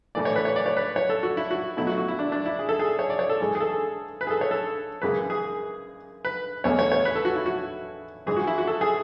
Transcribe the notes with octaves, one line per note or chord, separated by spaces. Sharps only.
A2 E3 A3 D5
C#5
B4
C#5
D5
C#5
B4
C#5
A4
F#4
E4
F#4
B2 F#3 A3 E4
F#4
F#4
E4
D4
D4
E4
G#4
A4
G#4
C#5
D5
C#5
A4
G#2 E3 G#3
G#4
A4
B4
G#4
A4
C#5
A4
F#2 C#3 E3 G#3 B4
G#4
B4
E2 B2 A3 C#5
C#5
C#5
B4
A4
F#4
E4
F#4
G#2 E3 G#3 G#4
F#4
E4
F#4
A4
G#4